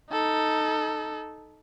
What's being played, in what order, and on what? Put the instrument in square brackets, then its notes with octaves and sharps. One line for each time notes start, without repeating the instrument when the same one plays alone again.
[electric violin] D#4 A4